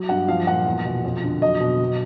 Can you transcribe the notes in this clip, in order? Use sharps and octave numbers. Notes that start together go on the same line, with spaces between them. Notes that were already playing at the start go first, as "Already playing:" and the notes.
Already playing: F#3
G2 F#5
F3 F5
A#2 F#5
E2
B2
F2
D3
F#3 D#5
B2
F#3